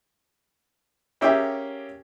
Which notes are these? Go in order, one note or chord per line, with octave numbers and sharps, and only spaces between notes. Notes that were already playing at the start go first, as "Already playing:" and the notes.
A#3 C#4 G4 G#4 E5 G5